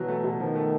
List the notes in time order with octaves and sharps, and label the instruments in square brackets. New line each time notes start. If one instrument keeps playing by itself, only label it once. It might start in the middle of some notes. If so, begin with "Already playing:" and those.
Already playing: [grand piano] B2 F#3 [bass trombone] E3
[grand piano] A3
B2
[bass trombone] D#3 [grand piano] F3
[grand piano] A3